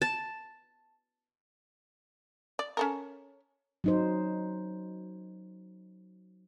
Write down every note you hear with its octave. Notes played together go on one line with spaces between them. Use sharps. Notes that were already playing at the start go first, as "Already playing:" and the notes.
A5
D5
C#4 A4 A#4
F#3 D#4 C5